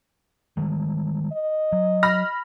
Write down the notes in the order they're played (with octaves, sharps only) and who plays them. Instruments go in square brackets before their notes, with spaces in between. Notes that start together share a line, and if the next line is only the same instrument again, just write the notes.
[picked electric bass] D#3 G3 G#3
[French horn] D#5
[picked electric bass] F#3
[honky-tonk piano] B5 F6 A#6